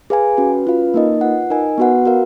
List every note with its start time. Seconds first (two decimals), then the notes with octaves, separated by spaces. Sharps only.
0.10 G#4 B4 F5 G#5
0.37 C#4 F#4 B4
0.65 C#4 F4 B4 F5
0.94 A#3 D#4 A#4 D#5
1.21 F4 B4 F#5
1.50 D#4 A#4 D#5 G#5
1.78 B3 F#4 B4 F#5
2.05 F#4 A#4 F5